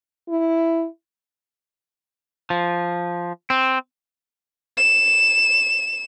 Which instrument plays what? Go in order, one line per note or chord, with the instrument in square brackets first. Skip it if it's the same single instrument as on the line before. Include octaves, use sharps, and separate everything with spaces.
[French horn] E4
[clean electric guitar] F3
C4
[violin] E7